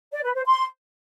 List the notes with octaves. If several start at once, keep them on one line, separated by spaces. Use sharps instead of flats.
D5
B4
C5
C6